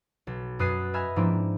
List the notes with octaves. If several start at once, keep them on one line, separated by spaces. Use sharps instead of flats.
B1
F#2 B4 D#6 F#6 C7 D#7
D#5 E5 G#5 B5 F6
G#2 F3 A#3 C4 D4 E4